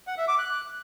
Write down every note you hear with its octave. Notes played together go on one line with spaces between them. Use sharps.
F#5
E5
D6
F#6